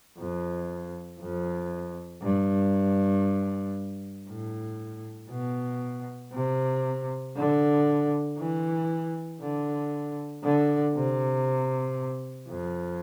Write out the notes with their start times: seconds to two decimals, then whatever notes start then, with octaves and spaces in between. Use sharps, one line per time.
0.18 F2
1.20 F2
2.23 G2
4.28 A2
5.30 B2
6.33 C3
7.36 D3
8.37 E3
9.41 D3
10.43 D3
10.95 C3
12.48 F2